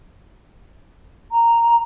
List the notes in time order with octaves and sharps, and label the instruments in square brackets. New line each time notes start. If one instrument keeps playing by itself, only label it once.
[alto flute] A#5